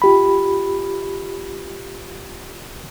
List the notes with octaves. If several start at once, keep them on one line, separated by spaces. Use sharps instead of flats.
F4 G4 B5